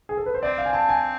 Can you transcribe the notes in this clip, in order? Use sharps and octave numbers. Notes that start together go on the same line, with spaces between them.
G#4
A4
B4
C5
C4 D5
F5
G#5
C4 A5
G#5